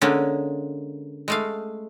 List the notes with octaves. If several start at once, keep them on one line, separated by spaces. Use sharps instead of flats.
D3 G#3 A#3 C#4
G#3 A3 F5